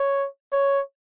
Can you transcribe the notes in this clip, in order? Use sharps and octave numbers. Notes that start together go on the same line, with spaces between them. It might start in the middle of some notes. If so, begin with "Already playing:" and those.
Already playing: C#5
C#5